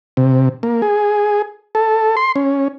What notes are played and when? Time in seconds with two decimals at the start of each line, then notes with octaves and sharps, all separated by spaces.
0.17 C3
0.63 A#3
0.82 G#4
1.75 A4
2.17 C6
2.36 C#4